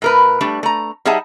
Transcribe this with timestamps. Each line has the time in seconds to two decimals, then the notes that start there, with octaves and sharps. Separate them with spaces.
0.02 A2 A#4 B4
0.41 G3 A3 D4
0.63 A3 A#5
1.05 G3 D#4 G#4 E5 F#5 A5